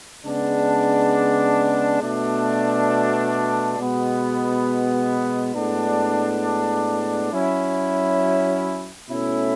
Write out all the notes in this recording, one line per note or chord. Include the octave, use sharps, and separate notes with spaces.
C#3 G#3 B3 D4
B2 A3 D4
B2 G#3 B3
A2 G#3 B3 D4
F#3 C#4 E4
B2 A3 C#4 E4